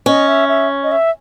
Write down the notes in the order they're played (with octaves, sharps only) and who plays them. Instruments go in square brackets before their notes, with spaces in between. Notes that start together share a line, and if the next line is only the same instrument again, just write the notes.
[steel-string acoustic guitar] C#4 [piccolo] D#5
[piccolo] E5
E5
D#5
E5